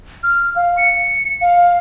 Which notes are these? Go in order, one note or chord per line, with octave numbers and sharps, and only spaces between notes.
F6
F5
C#7
F5